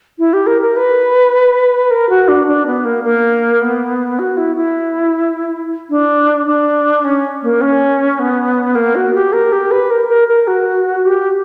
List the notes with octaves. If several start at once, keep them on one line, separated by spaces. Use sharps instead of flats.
E4
G4
A#4
A#4
B4
A#4
F#4
D4
D4
B3
A#3
A#3
B3
F#4
E4
E4
D4
D4
C#4
A#3
C#4
B3
A#3
F#4
G4
A#4
G4
B4
A#4
A#4
A#4
F#4
G4